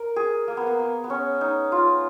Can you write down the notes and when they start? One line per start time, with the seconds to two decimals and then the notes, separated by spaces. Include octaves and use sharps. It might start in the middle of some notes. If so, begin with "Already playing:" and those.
Already playing: A#4
0.16 G#4
0.48 A#3
0.57 B3
0.67 A#3
0.79 B3
1.04 B3
1.10 C#4
1.41 D#4
1.72 F4